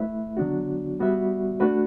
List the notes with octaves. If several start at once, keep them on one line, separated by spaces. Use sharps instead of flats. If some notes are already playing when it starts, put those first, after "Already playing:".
Already playing: A3 E4 B4 E5
D3 F#3 B3 D4 F#4
G3 B3 F#4 B4 E5
A3 D4 F#4 B4